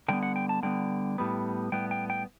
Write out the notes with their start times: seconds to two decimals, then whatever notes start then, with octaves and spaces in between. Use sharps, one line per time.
0.08 D3 G3 B3 G5
0.23 F#5
0.36 G5
0.49 A5
0.63 D3 G3 B3 G5
1.18 A2 G3 B3
1.72 A2 G3 B3 G5
1.91 G5
2.10 G5